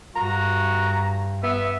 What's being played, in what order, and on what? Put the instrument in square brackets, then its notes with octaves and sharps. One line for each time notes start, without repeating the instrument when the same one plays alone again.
[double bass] G2 [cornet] F#4 [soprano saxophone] A#5
[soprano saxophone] B3 [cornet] E5